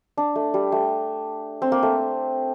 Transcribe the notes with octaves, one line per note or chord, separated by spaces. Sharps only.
D4
A3
G3
A3
C4
A#3
A3